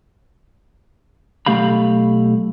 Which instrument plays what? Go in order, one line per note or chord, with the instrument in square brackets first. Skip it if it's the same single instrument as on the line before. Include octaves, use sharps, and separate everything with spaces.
[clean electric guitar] B1 F3 A3 G4 F5 B5